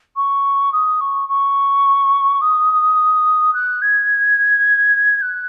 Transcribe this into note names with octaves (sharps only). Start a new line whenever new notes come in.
C#6
D#6
C#6
C#6
D#6
F#6
G#6
F#6